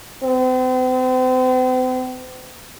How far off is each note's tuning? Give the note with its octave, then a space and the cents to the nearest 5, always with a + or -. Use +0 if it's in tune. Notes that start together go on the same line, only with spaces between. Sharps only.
C4 -40